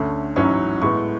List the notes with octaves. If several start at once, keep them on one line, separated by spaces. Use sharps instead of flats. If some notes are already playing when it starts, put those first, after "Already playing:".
Already playing: D2 D3 A3 C#4
A1 G#2 F#3 C#4 E4 C#6
A2 G#3 B3 C#6